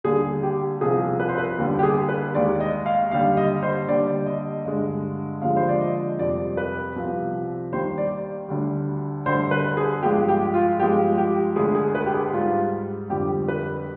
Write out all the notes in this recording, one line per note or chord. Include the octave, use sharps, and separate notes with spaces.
D#2 D3 G3 G#4
G4
C2 C3 F3 G#4
B4
C5
B4
D#2 D3 G3
G4
G#4
B4
D#2 D#3 G#3 D5
D#5
F5
D#2 D3 G3 F5
D#5
C5
D#2 D3 G3 D5
D#5
G2 D3 G#3
D#2 D3 F3 G#3 F5
C5
D5
D#5
F2 C3 G3 D5
B4
C2 C3 F3
D#2 D#3 G3 C5
D5
D2 D3 G3
D2 D3 G3 C5
B4
G#4
G2 F3 G#3 G4
G4
F4
G2 F3 G#3 G4
G4
D2 D3 G#3 G#4
G#4
B4
G4
G#4
G#2 G3 F4
F2 D3 G3 G4
B4